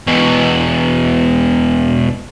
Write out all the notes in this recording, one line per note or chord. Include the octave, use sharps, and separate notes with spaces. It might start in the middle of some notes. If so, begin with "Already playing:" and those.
E2 B2